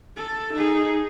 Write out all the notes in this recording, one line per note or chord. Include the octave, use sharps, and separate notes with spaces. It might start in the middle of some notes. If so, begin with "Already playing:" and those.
A4
D#4 G#4